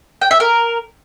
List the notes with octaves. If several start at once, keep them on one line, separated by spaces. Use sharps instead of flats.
G5
E5
A#4